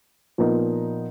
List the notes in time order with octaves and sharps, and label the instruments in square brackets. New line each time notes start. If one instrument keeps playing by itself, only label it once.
[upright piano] A#2 F3 B3 D#4 A#4